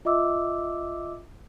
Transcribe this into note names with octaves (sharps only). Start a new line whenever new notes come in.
F4 D#5 E5 D6 E6